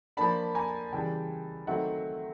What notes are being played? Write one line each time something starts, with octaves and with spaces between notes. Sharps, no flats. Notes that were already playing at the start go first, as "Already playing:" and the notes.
F3 A#3 D4 A5 B5
G#5 A#5
C#3 E3 G3 G5 A5
D#3 F#3 A3 C4 E5 F#5